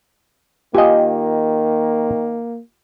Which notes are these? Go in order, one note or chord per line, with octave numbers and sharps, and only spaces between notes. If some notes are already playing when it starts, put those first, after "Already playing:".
D#3 A#3 F4 G4 D#5 G#5